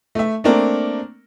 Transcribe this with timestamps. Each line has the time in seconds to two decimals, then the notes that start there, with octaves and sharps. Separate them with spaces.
0.15 A3 E5
0.44 A3 A#3 C4 D4 A#4